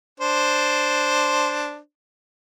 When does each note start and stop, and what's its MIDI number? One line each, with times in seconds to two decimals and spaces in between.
0.20 1.78 62
0.20 1.78 72